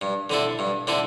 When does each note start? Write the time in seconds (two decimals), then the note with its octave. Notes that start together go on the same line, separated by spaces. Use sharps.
0.01 G2
0.30 D3 C4 E4 A4
0.59 G2
0.87 D3 C4 E4 A4